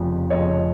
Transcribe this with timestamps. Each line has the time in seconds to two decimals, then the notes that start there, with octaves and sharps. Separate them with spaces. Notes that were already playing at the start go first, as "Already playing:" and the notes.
Already playing: F1 F2 C#3 F3
0.30 F1 F2 C#3 F3 C#5 D#5